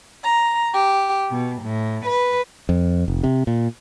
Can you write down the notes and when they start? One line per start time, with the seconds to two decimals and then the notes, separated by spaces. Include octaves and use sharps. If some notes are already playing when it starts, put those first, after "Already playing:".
0.24 A#5
0.73 G4
1.30 B2
1.61 A2
2.05 B4
2.69 F2
3.08 F1
3.23 C3
3.47 A#2